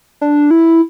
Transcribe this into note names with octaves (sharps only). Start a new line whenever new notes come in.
D4
E4